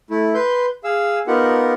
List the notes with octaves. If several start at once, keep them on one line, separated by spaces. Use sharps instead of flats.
A3 E4
B4 C6 G6
G#4 F5 E6
B3 D#4 F4 G4 A#4 F#5